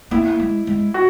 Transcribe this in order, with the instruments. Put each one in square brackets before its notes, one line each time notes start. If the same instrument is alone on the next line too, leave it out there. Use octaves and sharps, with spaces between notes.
[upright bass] A#3 [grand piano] E4
[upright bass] G#3
G#3
[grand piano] F#4